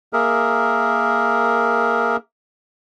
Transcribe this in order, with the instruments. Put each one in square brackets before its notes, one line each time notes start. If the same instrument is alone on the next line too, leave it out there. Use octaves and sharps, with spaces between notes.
[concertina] A#3 G#4 A#4 E5